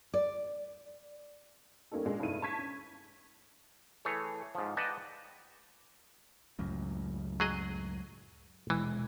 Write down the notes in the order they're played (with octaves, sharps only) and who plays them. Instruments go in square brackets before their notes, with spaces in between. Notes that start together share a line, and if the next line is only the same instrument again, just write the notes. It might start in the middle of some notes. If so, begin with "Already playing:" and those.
[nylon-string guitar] D5
[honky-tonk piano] G3 A3 A#3 C#4 D#4 A4
A#2 G#3 D4
G2 C3 A3 D#4 E4 D#7
A5 C#6 G#6 B6
C#4
[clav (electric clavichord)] E3 A3 G#4 C#5
G#2 F3
B4 D5 D#5 F#5 G5 A5
[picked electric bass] C#2 F#2 A2
[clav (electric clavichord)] F#3 G#4 D#5
[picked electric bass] D#1 B2 G#3 [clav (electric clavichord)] E3